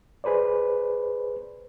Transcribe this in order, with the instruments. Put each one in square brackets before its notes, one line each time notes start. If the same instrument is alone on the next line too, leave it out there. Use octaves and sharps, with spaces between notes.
[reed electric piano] G#4 B4 C5 D5